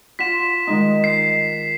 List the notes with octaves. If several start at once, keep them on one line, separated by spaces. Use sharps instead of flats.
F4 F#5 C6 B6 E7
D#3 G#3 D#4
C7